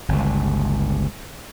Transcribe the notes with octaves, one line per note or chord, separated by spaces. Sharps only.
G1 C#2